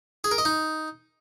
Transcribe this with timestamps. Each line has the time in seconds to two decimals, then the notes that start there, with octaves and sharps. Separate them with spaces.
0.24 G#4
0.31 A#4
0.38 D#5
0.45 D#4